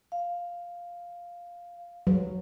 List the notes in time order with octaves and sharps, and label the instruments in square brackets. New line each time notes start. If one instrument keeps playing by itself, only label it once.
[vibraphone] F5
[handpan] F#3